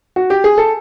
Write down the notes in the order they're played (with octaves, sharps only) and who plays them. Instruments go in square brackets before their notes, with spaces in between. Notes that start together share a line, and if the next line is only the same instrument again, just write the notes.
[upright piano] F#4
G4
G#4
A4